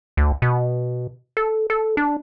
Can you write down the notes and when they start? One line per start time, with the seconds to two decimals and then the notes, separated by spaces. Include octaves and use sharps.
0.17 D2
0.42 B2
1.37 A4
1.70 A4
1.97 D4